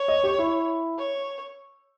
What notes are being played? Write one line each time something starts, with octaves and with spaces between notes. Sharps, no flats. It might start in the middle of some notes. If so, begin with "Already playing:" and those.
Already playing: C#5
D#5
G4
E4
C#5